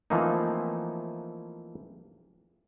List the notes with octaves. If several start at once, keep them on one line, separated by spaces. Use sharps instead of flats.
E3 F3 A3 A#3 C4 D#4